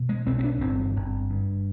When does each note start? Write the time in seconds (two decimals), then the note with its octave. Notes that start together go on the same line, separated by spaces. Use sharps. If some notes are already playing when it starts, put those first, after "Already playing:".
Already playing: B2
0.09 G#3
0.27 B1 C4
0.39 C4
0.44 D4
0.61 G1 C4
0.96 G1
1.30 G2